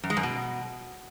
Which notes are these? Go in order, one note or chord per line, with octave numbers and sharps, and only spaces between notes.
F#2
G#3
F#2
B2